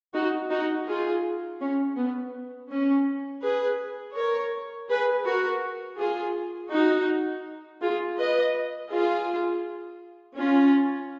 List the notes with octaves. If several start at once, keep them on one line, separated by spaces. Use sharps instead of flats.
D#4 F#4
D#4 F#4
F4 G#4
C#4
B3
C#4
G#4 B4
A#4 C#5
G#4 B4
F#4 A#4
F4 G#4
D#4 F#4
F4 G#4
B4 D#5
F4 G#4
C#4 F4